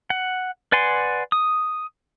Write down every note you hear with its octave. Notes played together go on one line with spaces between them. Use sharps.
F#5
B4 D5 F#5 G#5 C6
D#6